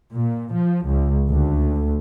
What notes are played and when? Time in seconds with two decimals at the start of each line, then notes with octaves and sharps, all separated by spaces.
0.12 A#2
0.55 F3
0.86 C#2
1.29 D2